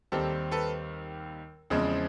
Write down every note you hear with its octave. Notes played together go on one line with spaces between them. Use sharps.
D#2 D#3 G3 C4 G4 A4
A4 B4
E2 C#3 F3 G#3 C4